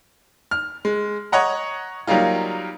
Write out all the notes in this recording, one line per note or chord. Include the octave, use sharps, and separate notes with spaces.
F6
G#3
C#5 D#5 F#5 A#5
F#3 G3 A#3 D#4 F4